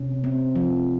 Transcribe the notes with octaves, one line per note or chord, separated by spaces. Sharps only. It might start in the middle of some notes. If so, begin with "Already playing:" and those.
Already playing: C3 C#4
C4
F3